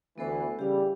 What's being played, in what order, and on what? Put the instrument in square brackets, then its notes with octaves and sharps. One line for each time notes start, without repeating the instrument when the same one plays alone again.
[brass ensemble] D2 E3 [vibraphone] B3 A4 C5
[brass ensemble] C#3 E3 G3 [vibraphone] G4 F5